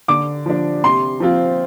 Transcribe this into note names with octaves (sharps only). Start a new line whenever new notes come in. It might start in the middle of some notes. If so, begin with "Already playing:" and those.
D3 D6
F3 D4
C3 C6
F3 C4 F4